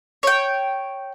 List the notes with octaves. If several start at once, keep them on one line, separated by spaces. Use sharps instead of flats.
C#5 G5